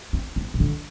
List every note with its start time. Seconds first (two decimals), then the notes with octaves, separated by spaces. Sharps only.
0.13 C4
0.36 C4
0.54 C3
0.60 D3